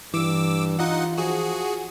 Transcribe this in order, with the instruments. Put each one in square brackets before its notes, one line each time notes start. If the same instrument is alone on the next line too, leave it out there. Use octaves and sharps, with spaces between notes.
[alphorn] G2 [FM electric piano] E3 [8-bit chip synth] D6 E6
[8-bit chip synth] D#4 D#5 F#5 [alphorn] F4
[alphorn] F3 [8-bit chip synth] F#4 G#4